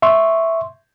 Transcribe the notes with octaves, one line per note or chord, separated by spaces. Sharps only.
E5 C6 C#6